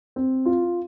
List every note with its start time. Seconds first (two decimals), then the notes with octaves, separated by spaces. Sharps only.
0.16 C4
0.46 F4